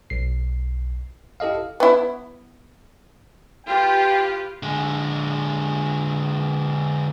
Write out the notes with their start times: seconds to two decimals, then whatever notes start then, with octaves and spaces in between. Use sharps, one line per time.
0.10 B1 C7
1.40 E4 G4 A4 D#5 F5
1.80 B3 E4
3.67 F4 G4 B4 G5
4.63 D3 G#3